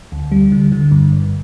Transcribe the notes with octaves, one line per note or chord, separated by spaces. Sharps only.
D2
G3
D3
D3
G2
G1